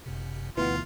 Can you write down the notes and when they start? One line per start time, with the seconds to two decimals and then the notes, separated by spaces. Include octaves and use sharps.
0.06 G1 F#2 C3
0.57 D2 B2 E3 F4 B4 F#5